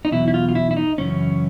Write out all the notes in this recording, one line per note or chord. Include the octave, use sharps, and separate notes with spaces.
D#4
E2 B2 F#3 E4
E4
F4
F4
E4
E4
D#4
F#2 C#3 E3 C#4